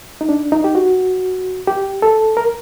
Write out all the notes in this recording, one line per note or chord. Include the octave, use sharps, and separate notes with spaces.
D#4
D4
D#4
G4
F#4
G4
A4
A#4